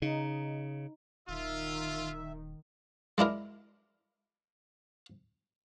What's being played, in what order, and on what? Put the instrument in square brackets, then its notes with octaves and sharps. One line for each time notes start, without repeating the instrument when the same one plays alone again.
[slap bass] C#3 [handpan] D#4
[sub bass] D#1 [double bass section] D#3 [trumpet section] F4 [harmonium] E5
[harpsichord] G#3 D4 E4 A#4